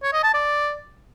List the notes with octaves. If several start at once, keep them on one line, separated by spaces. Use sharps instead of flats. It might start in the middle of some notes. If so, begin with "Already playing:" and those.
C#5
D#5
A5
D5